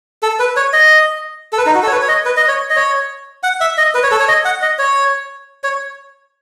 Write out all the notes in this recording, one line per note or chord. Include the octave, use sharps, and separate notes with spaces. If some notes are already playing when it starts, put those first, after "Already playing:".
A4
B4
C#5
D#5
A4
B4
D#4
F#4
A4
C#5
B4
C#5
D#5
B4
D#5
C#5
D#5
C#5
F#5
E5
D#5
B4
C#5
A4
C#5
D#5
F#5
D#5
C#5
C#5